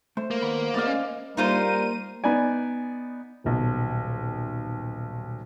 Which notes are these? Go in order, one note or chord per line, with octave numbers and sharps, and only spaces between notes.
A3 C5
A#3
D#2 B3 B5
A3 B3 G#4 D5 D#5 F5
C#4
G3 A#3 D#4 F4 A#4 C5 D#7
B3 D#4 D5 G#5
D#1 B1